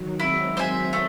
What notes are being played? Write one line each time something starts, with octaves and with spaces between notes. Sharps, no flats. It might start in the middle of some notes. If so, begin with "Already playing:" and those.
Already playing: D#3 F#3
G#3 C4 E4
C5 E5 G#5
A3